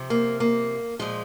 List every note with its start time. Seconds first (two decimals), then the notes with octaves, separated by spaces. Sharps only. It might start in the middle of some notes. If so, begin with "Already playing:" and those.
Already playing: C3 F3
0.10 A#3
0.40 A#3
0.99 A#2 F3 G#3